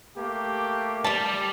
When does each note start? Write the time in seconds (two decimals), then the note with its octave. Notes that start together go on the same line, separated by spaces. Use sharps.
0.17 A3 A#3 G4
1.04 G3 D5 A5